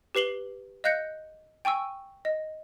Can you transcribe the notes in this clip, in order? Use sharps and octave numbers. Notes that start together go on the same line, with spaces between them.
G4 B4 C7 F#7 G7
D#5 F5 F#6 G6 A#6 C#7
G5 G#5 C#6 E6
D#5